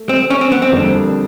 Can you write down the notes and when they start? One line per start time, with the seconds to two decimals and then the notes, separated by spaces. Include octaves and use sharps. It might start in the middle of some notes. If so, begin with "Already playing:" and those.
Already playing: A3
0.09 C4
0.30 C#4
0.41 C4
0.52 B3
0.62 C4
0.72 F2 D3 G3 A#3 D4